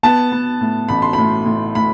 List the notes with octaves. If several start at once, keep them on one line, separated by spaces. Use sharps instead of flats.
B3 A5
B3
A2
A1 B5
C6
A2 B5
A2
A2 B5